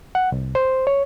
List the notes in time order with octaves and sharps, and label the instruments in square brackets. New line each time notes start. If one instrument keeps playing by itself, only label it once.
[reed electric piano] F#5
C2
C5
C#5